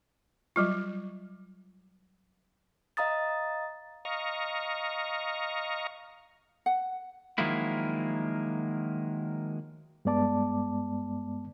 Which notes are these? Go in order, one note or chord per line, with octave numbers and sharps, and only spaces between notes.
F#3 G3 F4
D#5 F5 A#5 D#6 A6
D#5 F5 A#5 C#6
F#5
D#3 F3 F#3 G#3 A#3 E4
G2 G#3 B3 D5 A5 D6